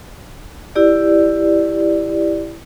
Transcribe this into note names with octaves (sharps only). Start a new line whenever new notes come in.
E4 G4 D5